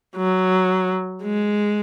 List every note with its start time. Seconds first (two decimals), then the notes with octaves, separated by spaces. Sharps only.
0.16 F#3
1.23 G#3